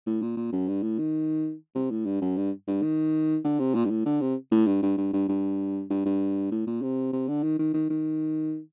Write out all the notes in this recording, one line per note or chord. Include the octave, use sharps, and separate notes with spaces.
A2
A#2
A#2
F#2
G2
A2
D#3
C3
A2
G2
F#2
G2
G2
D#3
D3
C3
A#2
G2
A2
D3
C3
A2
G2
G2
G2
G2
G2
G2
G2
A2
A#2
C3
C3
D3
D#3
D#3
D#3
D#3